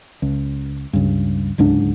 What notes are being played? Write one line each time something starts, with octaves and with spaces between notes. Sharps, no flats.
C#2
C#2 G2
D1 C#2 G#2 D4